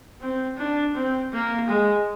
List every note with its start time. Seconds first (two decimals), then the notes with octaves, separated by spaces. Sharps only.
0.21 C4
0.57 D4
0.95 C4
1.32 A#3
1.68 G#3